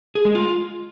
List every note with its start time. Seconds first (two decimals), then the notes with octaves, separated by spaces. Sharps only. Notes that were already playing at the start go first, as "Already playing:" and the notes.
0.15 G#4
0.25 G#3
0.35 F4